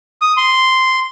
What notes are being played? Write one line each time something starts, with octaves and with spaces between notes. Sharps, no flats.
D#6
C6